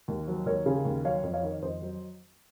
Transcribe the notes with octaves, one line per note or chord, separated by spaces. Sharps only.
D#2
F#3
D#2 A#4 C#5
C#3
D#2
F#3 C#5 F5
F2
C#5 F5
D#3
F2 C5 D#5
F#3